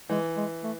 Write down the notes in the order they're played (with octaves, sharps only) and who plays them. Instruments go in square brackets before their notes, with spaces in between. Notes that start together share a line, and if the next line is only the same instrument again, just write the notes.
[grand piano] E3 [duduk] G#3
[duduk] G#3
A3